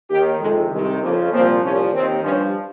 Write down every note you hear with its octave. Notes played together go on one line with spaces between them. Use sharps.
D#2 D#3 G4
F2 C3 D#3 G#3
C2 C3 D#3 G#3
F2 C#3 F3 A#3
C2 A#2 F3 C4
C2 A#2 F3 C#4
D#2 D#3 C4
G2 F3 C#4